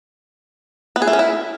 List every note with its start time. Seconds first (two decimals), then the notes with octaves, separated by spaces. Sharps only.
0.96 B3
1.02 G#4
1.07 A3
1.13 C#4
1.19 E4